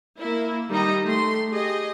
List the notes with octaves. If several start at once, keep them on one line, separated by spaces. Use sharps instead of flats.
A#3 E4
D#3 G3 D#4 D#5 A#5
A3 G4 C6
G4 G#4 D#5